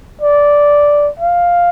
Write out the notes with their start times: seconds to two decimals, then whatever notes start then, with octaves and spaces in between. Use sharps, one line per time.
0.21 D5
1.19 F5